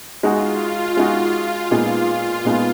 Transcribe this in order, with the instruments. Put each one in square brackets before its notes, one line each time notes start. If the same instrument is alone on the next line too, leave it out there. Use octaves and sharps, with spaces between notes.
[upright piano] G#3 D#4 F#4 [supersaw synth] F4
[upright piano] G#3 D#4 F#4
[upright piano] A#2 G#3 B3 D#4 [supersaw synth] F4
[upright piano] A#2 G#3 B3 D#4